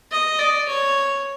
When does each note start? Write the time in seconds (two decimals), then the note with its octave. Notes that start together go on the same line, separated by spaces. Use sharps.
0.11 D#5
0.39 D5
0.68 C#5